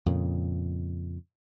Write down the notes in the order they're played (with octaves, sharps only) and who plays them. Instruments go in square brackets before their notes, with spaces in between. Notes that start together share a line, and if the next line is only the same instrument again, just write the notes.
[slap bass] F2 A#2 C#3